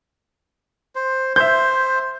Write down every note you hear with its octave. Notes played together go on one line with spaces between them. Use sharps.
C5
C5 E5 G6